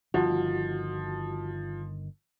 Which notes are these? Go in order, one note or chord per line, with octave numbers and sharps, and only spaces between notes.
G1 D#3 F3 F#4